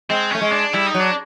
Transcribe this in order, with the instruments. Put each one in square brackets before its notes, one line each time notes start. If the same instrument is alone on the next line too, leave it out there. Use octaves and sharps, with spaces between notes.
[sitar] G#3 [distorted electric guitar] C4
[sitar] A3 [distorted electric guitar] C#4
[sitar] G#3
[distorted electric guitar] D4
[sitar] G3 [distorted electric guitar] E4
[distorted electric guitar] D#4
[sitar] F#3
[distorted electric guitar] D4